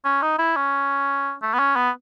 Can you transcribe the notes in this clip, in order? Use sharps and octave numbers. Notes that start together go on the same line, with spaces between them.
C#4
D#4
E4
C#4
A3
B3
C#4
B3